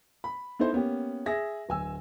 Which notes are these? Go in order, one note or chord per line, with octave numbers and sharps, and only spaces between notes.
B5
B3 D#4 E4 A4 C5
A#3 B3 C#4 G4
G#4 E5 A#6
D1 G#5 E6